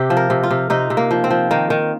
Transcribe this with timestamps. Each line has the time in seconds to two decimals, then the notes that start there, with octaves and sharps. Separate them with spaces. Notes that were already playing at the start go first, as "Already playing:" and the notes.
Already playing: C3 G4
0.10 F3
0.17 A#4
0.30 C3
0.43 F4
0.51 C3
0.70 C3 D#4
0.90 C3
0.97 A#3
1.11 F3
1.24 C4
1.31 F3
1.51 D#3 A#3
1.70 D#3